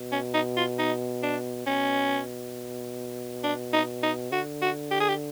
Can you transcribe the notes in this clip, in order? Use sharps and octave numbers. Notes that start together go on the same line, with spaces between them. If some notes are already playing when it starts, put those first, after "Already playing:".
Already playing: B2
C#4
D#4
F4
D#4
D4
B2 C#4
D4
D#4
D#4
D3 F#4
F#4
G4
G#4
G4